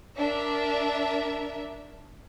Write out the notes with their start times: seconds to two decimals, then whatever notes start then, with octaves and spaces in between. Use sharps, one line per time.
0.16 D4 A#4 E5